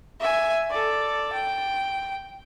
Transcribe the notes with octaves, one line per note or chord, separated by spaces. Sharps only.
E5 G#5
A4 D5
G5